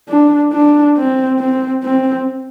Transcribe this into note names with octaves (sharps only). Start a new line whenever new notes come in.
D4
D4
C4
C4
C4